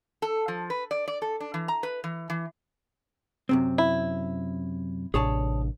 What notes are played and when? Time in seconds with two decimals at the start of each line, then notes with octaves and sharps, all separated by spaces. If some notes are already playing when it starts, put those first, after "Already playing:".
0.22 A4
0.48 F3
0.70 B4
0.91 D5
1.08 D5
1.22 A4
1.40 D4
1.54 E3
1.68 A#5
1.83 B4
2.04 E3
2.30 E3
3.49 F#2 C3 C4
3.78 E4
5.14 A1 C3 D4 G#4 C#5 A5